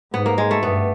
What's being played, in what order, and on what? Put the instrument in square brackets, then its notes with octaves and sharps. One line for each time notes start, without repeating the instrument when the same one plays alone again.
[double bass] G#2 [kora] B3
[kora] A#3
G#3
A3
[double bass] G2 [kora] B3